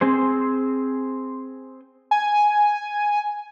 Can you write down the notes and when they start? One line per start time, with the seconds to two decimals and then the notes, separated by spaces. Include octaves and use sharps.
0.01 C4 G#4 C5
2.11 G#5